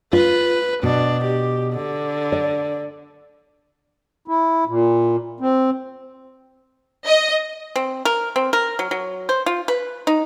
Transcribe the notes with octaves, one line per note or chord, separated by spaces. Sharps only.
F4 B4
B2 D4
G4
D3
D5
E4
A#2
C4
D#5
C4
A#4
C4
A#4
F#3
F#3
C5
F4
B4
D#4